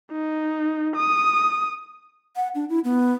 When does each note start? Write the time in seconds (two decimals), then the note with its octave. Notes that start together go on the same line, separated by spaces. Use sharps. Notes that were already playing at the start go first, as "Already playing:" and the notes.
0.12 D#4
0.96 D#6
2.36 F#5
2.55 D4
2.69 E4
2.84 B3